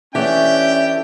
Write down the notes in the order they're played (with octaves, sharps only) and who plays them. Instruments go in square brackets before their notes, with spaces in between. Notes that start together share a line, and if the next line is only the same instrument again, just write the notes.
[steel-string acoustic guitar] E3 A3 [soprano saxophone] C#4 [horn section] D4 G4 G5 [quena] E5